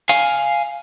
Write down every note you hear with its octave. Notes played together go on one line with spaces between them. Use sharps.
F5 G#5